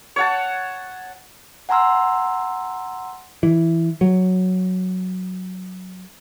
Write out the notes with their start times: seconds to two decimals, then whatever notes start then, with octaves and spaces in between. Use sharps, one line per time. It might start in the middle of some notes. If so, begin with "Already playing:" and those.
0.16 C#5 F#5 A5
1.69 F#5 G#5 A#5 C6 E6 F6
3.43 E3
4.01 F#3